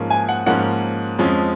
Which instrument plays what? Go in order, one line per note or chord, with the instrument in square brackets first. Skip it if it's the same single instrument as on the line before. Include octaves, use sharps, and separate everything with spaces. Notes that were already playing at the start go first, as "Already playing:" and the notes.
Already playing: [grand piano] G#2 F3 A#3 C#4
G#5
F#5
G#2 F3 A#3 C#4 F#5
F2 F3 G#3 C#4